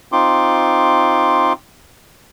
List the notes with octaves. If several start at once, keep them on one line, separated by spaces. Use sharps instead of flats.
C4 D#4 F4 C6 D6